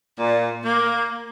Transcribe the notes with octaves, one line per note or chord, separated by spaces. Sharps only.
A#2
A#3